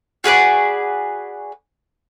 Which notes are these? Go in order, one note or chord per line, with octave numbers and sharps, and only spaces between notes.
F#4 G#4 B4 D5